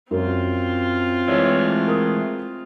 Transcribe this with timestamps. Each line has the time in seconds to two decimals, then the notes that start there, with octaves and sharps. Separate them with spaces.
0.11 F#2 C4 F4
1.28 E3 G#3 A3 C#5
1.87 A#4 D#6